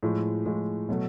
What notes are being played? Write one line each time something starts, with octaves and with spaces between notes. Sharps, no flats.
A2 F3 G#3
A2 F3 G#3
B2 F#3 A3